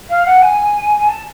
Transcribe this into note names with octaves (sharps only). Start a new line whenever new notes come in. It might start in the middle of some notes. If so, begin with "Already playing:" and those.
F5
F#5
G#5
G#5
A5